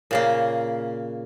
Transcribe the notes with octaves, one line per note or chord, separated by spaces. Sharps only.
A#2 C#3 A#3